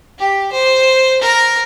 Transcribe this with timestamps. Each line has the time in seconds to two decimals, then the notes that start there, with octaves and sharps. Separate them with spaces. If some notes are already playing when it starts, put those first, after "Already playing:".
0.18 G4
0.52 C5
1.22 A#4